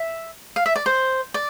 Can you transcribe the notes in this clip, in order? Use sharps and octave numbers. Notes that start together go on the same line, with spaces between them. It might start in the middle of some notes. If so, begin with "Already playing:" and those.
Already playing: E5
F5
E5
D5
C5
D5